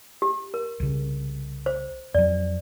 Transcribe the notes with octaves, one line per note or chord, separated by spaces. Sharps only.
G4
A#4
C2 C#3
C5
F2 F#3 D5